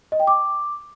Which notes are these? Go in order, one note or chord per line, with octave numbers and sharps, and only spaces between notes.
D#5
G5
D6